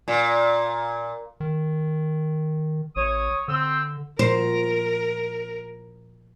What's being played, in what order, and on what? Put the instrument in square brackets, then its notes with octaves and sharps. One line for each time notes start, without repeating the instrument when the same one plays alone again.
[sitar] A#2
[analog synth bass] D#3
[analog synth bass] A1 [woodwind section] C#5 D#6
[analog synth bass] D3 [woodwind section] C4 E6
[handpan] A#2 F3 F#4 [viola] A#4 [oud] C5